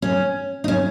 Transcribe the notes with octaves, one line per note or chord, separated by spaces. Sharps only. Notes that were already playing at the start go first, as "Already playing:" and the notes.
C#4
D#4
C#4